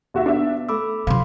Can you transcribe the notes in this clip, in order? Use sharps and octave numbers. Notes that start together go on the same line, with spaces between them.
D#2 F#4 E5
B3 D4 E5
A3 B5 D6 E6
C3 F3 F5 B5 C6